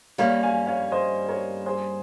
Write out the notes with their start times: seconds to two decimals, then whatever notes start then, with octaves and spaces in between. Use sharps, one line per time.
0.18 G2 G3 A#3 C#4 C#5 F5
0.43 F5 G#5
0.67 C#5 F5
0.92 C5 D#5
1.28 A#4 C#5
1.66 G#4 C5